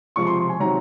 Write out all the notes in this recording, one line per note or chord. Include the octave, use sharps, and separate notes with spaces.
C#2 C3 F3 C#6
C6
C6
G#5
C3 D#3 F#3 A#5